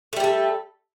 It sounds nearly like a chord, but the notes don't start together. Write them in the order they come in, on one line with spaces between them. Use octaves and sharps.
A3 G3 G4 A4